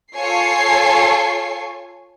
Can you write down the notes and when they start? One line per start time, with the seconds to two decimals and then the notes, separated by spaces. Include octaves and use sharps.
0.15 F4 A4 C#5 G#5 C#6 C7